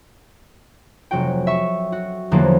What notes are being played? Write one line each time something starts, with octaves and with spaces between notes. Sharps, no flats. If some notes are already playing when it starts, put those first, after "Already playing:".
F1 F#3 F#4 G5
E5 C#6
F#4
E2 D3 F3 F#3 A#3 B3